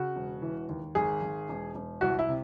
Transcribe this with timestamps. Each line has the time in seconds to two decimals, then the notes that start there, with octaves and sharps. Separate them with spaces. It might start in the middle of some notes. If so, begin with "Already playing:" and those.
Already playing: C#3 F#4
0.16 E1
0.42 E3
0.69 D#2
0.95 G#1 G#4
1.22 G#1
1.49 E1
1.75 E1
2.01 C2 F#4
2.19 E4
2.28 C3